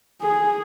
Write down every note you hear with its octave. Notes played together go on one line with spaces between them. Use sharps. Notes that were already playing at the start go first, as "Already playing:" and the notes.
G#4